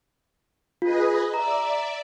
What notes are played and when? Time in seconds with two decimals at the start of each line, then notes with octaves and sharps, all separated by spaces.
0.82 F4 G#4 B4 D#5
1.34 D5 E5 A#5